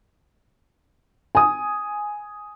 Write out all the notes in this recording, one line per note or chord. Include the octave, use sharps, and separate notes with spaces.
G#5 D#6